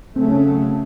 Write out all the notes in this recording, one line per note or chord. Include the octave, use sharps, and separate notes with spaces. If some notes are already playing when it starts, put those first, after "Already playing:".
C#3 F#3 A3 C4
C#4